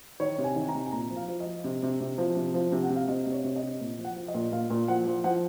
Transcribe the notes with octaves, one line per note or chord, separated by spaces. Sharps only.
D#3 C#5
C3
G#5
D#3
A#5
C3
G#5
A#2 A#5
F3
F5
F3
D#5
F3
C3
C3
C3
F3
C3
F3
C3
F#5
C3
F5
C3 D#5
C3
C#5
C3
D#5
C3
A#2
F3
F#5
F3
D#5
A#2
A#2 F5
A#2
F3 F#5
F3
F3 F#5